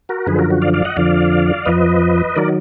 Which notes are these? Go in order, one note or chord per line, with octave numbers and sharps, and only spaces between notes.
F#4 A#4
F#2 D3 F3 G#4 B4
F#4 A#4
F#4
D5 F5
D5 F5
D#5 F#5
F2 D3 F3 D5 F5
F2 F3 B4 D#5
D#3 F#3 A#4 D5